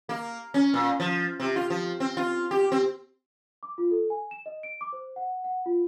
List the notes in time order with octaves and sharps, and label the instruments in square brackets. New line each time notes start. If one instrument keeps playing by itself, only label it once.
[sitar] A#3
C#4
A#2
F3
C3
F4
F3
C4
F4
G4
C4
[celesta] D6
F4
A4
G#5
E7
D#5
D7
D6
C5
F#5
F#5
F4